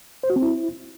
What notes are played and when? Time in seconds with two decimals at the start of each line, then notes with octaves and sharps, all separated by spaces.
0.23 C5
0.30 F#4
0.36 C4
0.42 E4